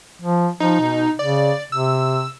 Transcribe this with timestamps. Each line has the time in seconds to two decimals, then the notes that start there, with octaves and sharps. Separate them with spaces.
0.22 F3
0.60 F3 D#4
0.81 B2
1.19 C#3 D5
1.72 C3 E6